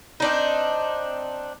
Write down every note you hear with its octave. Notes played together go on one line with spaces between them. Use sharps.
C4 D4 D#4